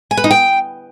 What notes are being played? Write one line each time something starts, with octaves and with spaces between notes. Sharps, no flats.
G#5
B4
D#4
G5